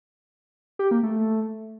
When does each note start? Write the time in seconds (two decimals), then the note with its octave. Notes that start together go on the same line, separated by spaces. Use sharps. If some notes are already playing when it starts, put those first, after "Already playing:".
0.79 G4
0.91 A#3
1.03 A3